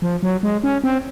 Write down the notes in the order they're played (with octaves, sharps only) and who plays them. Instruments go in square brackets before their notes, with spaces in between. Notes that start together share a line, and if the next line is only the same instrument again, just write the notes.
[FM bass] F3
F#3
G#3
C#4
C4